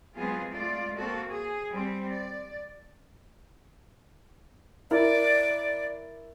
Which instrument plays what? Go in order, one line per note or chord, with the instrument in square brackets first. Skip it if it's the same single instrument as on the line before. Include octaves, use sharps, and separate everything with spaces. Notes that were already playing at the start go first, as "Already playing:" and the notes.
[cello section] F#3 G#3 B3 C4 F4 G#4
G#3 A3 F4 D5
A#3 C4 F#4 A4
G#4
G3 C4
D5
[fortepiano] E4 A#4 [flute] D5